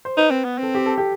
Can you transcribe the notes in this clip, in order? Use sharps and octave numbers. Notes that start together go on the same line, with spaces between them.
C5
D#4 B4
C4
B3
C4 A4
G4
A4
G4